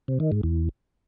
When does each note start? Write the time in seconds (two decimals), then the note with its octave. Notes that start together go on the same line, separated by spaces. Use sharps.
0.08 C3
0.20 D#3
0.32 G#2
0.43 E2